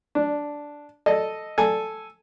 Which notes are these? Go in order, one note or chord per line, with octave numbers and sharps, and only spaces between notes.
D4
A4 D#5
A4 G#5